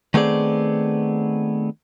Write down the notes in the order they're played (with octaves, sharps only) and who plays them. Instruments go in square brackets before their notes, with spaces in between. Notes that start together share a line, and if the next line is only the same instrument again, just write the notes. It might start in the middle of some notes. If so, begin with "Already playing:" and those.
[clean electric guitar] D#3 A3 B3 C4 G#4 D5